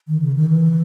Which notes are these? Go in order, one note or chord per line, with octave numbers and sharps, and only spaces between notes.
D#3
C#3
D#3
E3